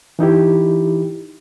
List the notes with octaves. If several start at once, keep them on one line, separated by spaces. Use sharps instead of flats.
E3 D#4 E4 G4